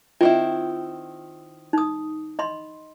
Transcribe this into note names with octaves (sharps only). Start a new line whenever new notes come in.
D#3 C4 E4 F4
D#4 D#6
D#5 B5 C6